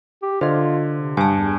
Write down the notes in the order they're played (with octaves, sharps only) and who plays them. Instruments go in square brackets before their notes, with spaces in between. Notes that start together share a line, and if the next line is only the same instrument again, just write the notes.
[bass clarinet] G4
[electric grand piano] D3 [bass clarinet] F4 [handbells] C5 D#5
[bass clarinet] C3
[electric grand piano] G2 [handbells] G#5 A5
[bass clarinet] E2